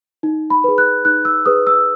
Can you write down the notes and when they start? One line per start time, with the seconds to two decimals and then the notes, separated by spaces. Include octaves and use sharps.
0.23 D#4
0.50 B5
0.64 G#4 B4
0.78 F#6
1.05 D#4 F#6
1.25 E6
1.46 G#4 B4 D#6
1.67 E6